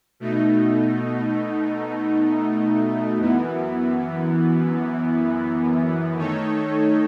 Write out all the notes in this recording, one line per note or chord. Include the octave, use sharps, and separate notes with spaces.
B2 A3 D#4
F#2 E3 B3
D#3 A3 D#4 A4 C#5